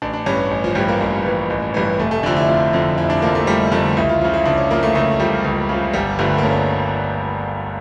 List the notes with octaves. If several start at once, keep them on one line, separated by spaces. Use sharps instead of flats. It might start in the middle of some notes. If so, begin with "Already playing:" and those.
A1 D4
D4
G2 E3 C#4
A1
F3
G2 E3 G3
A#3
A1
G2 E3
A1
G2 E3
F1 A3
A3
F2 D3 F3 D4
E4
F1 F4
F2 D3 F3
F1 E4
D4
F2 D3 F3 A#3
A3
F1 G3
F2 D3 F3 A3
C#2 E4
F4
C#3 F3
E4
C#2 D4
C#4
C#3 F3 A#3
A3
C#2 A3
C#3 F3 G3
C#2
C#3 F3
G1 G3
G2 D3 F3 A3
A#3
G1 C#4